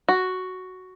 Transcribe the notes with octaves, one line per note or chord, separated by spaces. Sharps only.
F#4